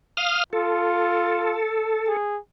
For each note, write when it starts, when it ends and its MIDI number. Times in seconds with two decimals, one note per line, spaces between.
0.17 0.44 77
0.17 0.44 87
0.17 0.44 89
0.53 1.59 65
0.53 2.17 69
2.08 2.38 68